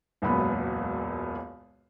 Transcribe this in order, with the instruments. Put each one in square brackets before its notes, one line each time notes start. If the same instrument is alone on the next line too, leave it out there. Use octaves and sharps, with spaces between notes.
[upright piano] E1 C#2 F#2 A#2 B3 B5